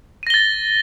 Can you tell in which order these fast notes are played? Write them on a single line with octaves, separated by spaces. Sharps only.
D#7 A#6 G7 A6